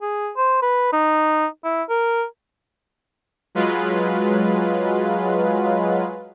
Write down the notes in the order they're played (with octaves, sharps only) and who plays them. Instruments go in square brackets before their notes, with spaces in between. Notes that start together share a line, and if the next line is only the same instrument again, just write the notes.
[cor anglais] G#4
C5
B4
D#4
E4
A#4
[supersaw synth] F#3 G#3 F4 B4